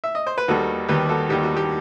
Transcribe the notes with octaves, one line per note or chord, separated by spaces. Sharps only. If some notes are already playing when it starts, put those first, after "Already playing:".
E5
D#5
C5
B4
D#2 D#3 G3 F#4 A4
D#2 D#3 G3 G4 B4
F#4 A4
D#2 D#3 G3 G4
F#4
G4